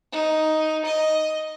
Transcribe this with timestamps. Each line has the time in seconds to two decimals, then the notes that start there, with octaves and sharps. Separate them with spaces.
0.12 D#4
0.85 D#5